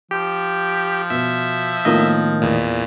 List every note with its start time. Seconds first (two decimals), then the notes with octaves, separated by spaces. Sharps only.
0.11 F3 G4
1.10 B2 E5
1.85 A2 D#3 A#3 B3 F4 D#5
2.42 E2 A#2